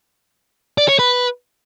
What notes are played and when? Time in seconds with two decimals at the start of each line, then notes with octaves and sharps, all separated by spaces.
0.78 D5
0.88 C#5
0.99 B4